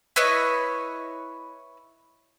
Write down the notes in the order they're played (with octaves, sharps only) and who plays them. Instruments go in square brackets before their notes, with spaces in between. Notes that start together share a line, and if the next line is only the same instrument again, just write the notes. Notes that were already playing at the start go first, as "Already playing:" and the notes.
[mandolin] E4 B4 C#5 D#5